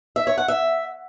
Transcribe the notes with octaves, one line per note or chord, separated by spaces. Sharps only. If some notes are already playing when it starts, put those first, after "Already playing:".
E5
C#5
F#5
E5